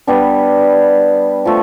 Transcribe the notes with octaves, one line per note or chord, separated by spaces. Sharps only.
G3 B3 D4
F3 A3